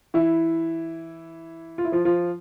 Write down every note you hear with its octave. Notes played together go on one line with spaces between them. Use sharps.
E3 E4
F4
E4
F3 F4
F3 F4